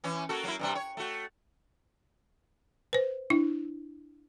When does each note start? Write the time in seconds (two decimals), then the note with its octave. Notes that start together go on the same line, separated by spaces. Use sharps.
0.04 E3 C#4
0.29 A#3 F#4 A4
0.44 F#3 A#3 E4
0.59 G2 C3 G3
0.75 C#5
0.97 A3 F#4
2.93 B4 C5
3.30 D4 E4